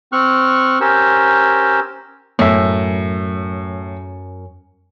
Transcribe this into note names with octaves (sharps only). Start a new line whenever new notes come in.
C4 C#6 F6 F#6
C#4 G4 A#4 C5 E6
F#2 A2 E5